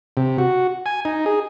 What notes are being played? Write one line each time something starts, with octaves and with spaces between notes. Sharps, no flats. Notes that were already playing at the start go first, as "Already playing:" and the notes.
C3
F#4
G#5
D#4
G#4